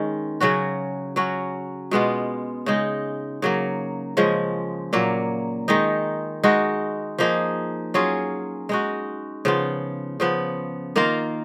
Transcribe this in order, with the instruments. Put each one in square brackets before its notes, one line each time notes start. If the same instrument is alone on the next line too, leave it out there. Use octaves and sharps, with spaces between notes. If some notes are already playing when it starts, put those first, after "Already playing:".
Already playing: [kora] D#3 G#3 C#4
C#3 F#3 C#4 F#4
F#3 C#4 F#4
B2 G#3 B3 F4
C#3 G#3 D#4
C#3 F#3 A#3
C#3 F3 G#3 C#4
A#2 F#3 A#3
D#3 G#3 D#4
G#3 D#4 F#4
F3 A#3 D#4 G#4
F#3 C#4 F4 G#4
G#3 D#4 F#4
C#3 F3 B3 F4
C#3 F3 B3
D#3 A#3 F4 A#4